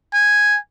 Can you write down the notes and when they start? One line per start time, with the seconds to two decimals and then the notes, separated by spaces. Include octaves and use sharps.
0.14 G#5